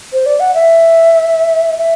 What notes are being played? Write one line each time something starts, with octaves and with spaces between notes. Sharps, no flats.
C5
D5
F#5
E5
E5